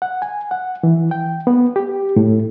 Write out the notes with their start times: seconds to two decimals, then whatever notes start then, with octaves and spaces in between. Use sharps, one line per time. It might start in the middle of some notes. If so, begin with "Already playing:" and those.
0.02 F#5
0.22 G#5
0.51 F#5
0.83 E3
1.11 G5
1.47 B3
1.76 G4
2.16 A2